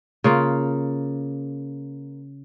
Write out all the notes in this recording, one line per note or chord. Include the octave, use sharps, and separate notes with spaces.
C#3 A#3 F4